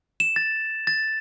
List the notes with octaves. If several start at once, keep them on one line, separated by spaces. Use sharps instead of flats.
E7
A6
A6